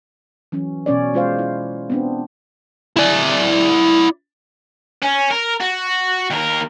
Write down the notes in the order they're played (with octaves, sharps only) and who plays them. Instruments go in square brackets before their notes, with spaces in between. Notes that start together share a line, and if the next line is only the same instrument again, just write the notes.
[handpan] E3 F#3 C#4
B2 C#4 C#5 D5
G#3 F4 C5 F5
E4
B3 C4 D4
[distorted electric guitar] E4 D5
C#4
A#4
F#4
D#2 A#4